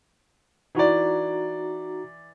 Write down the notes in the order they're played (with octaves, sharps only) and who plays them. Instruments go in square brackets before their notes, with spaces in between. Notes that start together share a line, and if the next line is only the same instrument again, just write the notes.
[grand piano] E3 D5 [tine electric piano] D#4 F#4 A#5